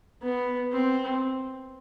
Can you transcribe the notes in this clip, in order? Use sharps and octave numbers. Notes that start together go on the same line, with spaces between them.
B3
C4